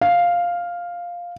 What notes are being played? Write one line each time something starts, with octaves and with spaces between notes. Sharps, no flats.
F5